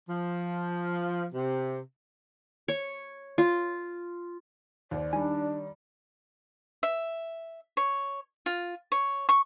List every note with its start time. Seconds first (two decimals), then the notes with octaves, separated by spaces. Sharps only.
0.08 F3
1.33 C3
2.68 C#5
3.38 F4
4.91 D#2 C5 D5
5.13 D#3 G3 D4 G#5
6.83 E5
7.77 C#5
8.46 F4
8.92 C#5
9.29 C#6